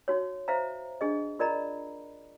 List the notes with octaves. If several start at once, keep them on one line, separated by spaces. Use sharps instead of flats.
D#4 F#4 C#5
C5 E5 F5 A#5
D4 G#4 D#5
F4 A#4 D5 D#5 A#5 B5